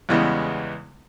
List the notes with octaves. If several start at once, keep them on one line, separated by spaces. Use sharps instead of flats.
E2 C#3 E3 G3 G#3 B3